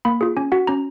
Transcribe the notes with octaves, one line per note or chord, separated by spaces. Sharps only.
A#3 B5
F4 G#4
C#4 G#5
F#4 F#5
C#4 A#5